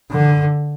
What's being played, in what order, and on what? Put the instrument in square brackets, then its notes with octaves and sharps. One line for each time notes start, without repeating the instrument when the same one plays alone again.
[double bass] D3